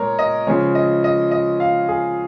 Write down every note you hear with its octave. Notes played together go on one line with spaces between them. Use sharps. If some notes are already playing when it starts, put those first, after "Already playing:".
Already playing: A#2 G#3 A#4 C#5
D#5
C#3 F3 G#3 C#5
D#5
D#5
D#5
F5
G#4